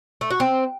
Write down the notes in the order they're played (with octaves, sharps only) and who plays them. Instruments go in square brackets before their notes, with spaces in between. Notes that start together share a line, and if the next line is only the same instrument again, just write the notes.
[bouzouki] A3
F#4
C4